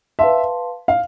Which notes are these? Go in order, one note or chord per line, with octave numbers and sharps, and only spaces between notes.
B4 E5 F5 A5 C6
F5